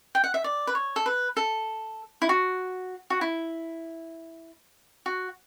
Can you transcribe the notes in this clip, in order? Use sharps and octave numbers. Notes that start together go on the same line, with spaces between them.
G5
F#5
E5
D5
B4
C#5
A4
B4
A4
E4
F#4
F#4
E4
F#4